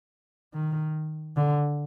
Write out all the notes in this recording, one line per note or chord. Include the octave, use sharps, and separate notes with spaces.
D#3
D3